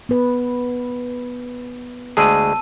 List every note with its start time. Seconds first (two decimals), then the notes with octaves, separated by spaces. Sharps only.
0.09 B3 B4
2.17 D2 G#3 G#4 A5 E6 D#7